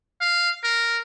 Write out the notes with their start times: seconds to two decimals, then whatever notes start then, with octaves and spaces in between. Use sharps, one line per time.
0.21 F5
0.64 A#4